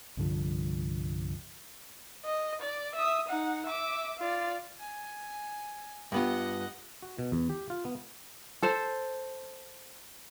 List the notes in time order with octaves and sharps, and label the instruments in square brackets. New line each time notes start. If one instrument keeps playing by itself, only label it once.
[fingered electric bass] C2 G2 D3 F3
[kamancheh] D#5
D5
E5 D#6
D#4 F#5
E5 D6
F4 D5
[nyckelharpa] G#5
[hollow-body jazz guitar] G2 B3 F4 [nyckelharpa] D#5 F#5
[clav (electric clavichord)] F#4
B2
E2
G4
F4
B3
[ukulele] A4 C5